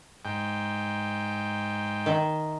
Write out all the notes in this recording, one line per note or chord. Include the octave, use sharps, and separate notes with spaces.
G#2 G5
D#3 E5